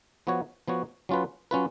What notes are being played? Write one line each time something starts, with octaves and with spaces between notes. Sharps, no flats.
F3 B3 F#4 C#5
F3 B3 F#4 C#5
F#3 C#4 F4 B4
F#3 C#4 F4 B4